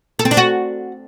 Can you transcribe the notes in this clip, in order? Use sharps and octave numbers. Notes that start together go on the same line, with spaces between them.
A4
C4
D4
F#4